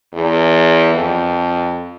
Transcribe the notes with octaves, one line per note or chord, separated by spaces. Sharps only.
E2
F2